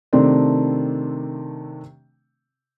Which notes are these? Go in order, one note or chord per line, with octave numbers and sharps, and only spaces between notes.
C3 D#3 A3 C4 D4